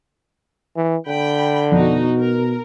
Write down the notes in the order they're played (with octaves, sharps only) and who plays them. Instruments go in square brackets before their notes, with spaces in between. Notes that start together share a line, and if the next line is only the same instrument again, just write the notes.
[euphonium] E3
[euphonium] D3 [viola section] G5 B5
[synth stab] F2 D4 [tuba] B2 [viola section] D#4 F#4
[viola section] A#4